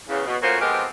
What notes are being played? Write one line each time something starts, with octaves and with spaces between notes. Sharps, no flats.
E2 C#3
B2
A3 A#3 C#4 F4 F#4 C5
F3 G#3 B3 C4 G4 A#4